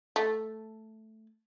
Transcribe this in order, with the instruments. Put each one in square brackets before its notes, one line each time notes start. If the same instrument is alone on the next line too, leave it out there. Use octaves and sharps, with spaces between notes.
[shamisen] A3